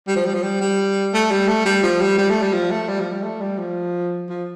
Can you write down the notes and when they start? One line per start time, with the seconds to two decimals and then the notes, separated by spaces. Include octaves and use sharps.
0.08 G3
0.16 F3
0.26 G3
0.34 F3
0.43 G3
0.61 G3
1.14 A3
1.31 G3
1.48 A3
1.66 G3
1.83 F3
2.01 G3
2.19 G3
2.30 A3
2.42 G3
2.54 F3
2.71 A3
2.89 G3
3.00 F3
3.12 G3
3.23 A3
3.41 G3
3.58 F3
4.29 F3